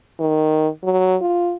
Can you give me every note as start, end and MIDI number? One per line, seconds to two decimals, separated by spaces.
0.20 0.68 51
0.84 1.16 54
1.22 1.55 65